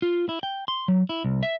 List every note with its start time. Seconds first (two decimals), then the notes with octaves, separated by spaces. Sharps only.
0.02 F4
0.29 E4
0.43 G5
0.68 C6
0.88 F#3
1.09 E4
1.24 C2
1.43 E5